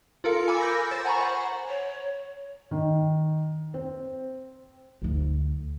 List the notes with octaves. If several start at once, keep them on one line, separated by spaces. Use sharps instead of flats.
F4 A4 A#4 F5 C#7
G#5 B5 D6 E6
A#4 G6 A#6
C5 A6
F#5 G#5 A#5 B5 C#6
C5 F#5
C#5
D#3
C4
D2 D#4